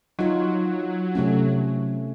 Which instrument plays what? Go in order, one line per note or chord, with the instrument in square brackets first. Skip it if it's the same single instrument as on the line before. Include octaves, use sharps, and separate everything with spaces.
[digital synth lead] F#3 [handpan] D#4 F4
[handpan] C3 A3 C#4